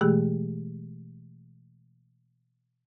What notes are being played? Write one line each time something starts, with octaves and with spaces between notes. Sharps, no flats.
B2 E3 G#3 A3 G4 G#4